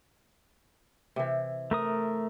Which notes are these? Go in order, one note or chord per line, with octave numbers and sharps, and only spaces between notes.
C3 E3
A3 A#4 D#6